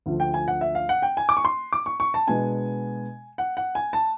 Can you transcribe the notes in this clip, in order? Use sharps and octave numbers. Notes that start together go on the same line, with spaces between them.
D2 D3 F3
G5
G#5
F#5
E5
F5
F#5
G5
G#5
D6
C#6
C6
D6
C#6
C#6
A5
B2 G#3 B3 D4 G#5
F#5
F#5
G#5
A5